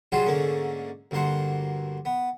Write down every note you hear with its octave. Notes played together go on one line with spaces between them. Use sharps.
F#3 G3 F4 F#4 G#4 C5
G#2 D3 A3 A#3 C#4
D2 G2 A#3 C5 F#5
B3